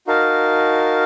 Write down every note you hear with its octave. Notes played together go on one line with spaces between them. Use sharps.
D#4 F#4 A#4 F5 A5